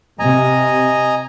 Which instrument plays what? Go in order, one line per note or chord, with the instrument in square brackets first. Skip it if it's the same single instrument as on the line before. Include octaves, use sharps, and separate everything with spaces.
[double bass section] C3 [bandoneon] D#5 G#5 A#5